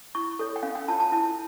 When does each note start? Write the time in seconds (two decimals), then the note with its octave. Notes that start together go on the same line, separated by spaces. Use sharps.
0.15 E4 C#6
0.39 A4 C#5
0.56 G5
0.63 C#4 F5
0.75 G5
0.88 F4 C#5 A5
1.00 A5
1.12 E4 A5